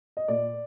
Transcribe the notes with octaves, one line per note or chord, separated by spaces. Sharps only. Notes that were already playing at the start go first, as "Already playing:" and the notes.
D#5
A#2 D5